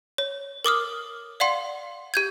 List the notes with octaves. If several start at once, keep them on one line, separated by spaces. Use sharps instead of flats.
C#5
A#4 D6 D#6 F6
D5 F5 F#5 C6
G4 G6 G#6